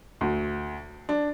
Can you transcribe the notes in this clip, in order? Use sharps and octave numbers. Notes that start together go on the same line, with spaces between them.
D2
D4